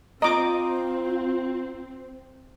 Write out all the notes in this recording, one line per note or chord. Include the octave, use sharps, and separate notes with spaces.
C4 F4 D#5 A#5 D6